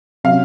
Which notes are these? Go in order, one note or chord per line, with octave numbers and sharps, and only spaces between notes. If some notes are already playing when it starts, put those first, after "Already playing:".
C3 F#3 C#4 F5